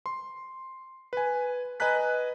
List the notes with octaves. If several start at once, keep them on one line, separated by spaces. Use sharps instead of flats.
C6
B4 G#5
B4 D#5 G#5 A#5 F#6 B6